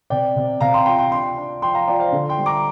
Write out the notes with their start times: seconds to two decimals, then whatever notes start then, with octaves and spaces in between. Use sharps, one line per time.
0.10 C3 D5 G5
0.36 C3
0.61 C3 F5 A#5
0.74 G5 C6
0.86 F4 G5 C6
0.99 G5 C6
1.11 D4 G5 C6
1.37 D4
1.62 F3 G5 C6
1.74 F5 A#5
1.88 F4 D5 G5
1.99 C5 F5
2.12 D3
2.29 G5 C6
2.38 G3
2.46 A#5 D6